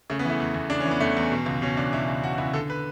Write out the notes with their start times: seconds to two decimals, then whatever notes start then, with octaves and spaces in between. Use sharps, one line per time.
0.10 C#3 A3
0.19 B3
0.25 E3 A3
0.40 E2
0.54 E2
0.70 C#3 D4
0.80 E3 C#4
0.91 B3
1.00 E2 A3
1.17 E2
1.32 B2
1.46 C#2
1.62 B2 C#4
1.77 C#2 D4
1.93 B2 E4
2.08 C#2
2.23 B2 F#4
2.33 F#4
2.38 C#2 E4
2.53 D3 A4
2.70 B4